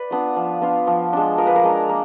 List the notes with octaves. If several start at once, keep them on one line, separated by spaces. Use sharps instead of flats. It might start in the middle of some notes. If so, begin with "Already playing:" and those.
Already playing: B4 D5
B3 D4 F4
F3
B3 D4 F4
F3
G#3 D4
F3 A#4
B4
A#4
G#3 D4
A#3